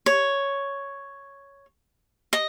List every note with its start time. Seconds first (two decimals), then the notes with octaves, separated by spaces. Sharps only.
0.06 C#5
2.33 D#5